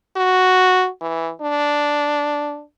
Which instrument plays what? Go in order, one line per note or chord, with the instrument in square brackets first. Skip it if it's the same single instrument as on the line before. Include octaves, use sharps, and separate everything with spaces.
[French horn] F#4
E3
D4